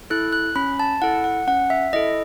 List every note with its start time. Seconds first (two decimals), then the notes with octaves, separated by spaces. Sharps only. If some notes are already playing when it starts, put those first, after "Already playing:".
0.10 E4 A4 F#6
0.33 F#6
0.55 C#4 B5
0.80 A5
1.02 E4 A4 F#5
1.24 F#5
1.47 C#4 F#5
1.70 E5
1.93 E4 A4 D#5